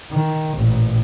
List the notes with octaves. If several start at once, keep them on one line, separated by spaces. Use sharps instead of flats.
D#3
A1 A#2